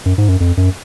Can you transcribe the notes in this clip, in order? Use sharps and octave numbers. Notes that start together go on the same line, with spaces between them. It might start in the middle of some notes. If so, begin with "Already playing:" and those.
F#2
G#2
F#2
F2
F#2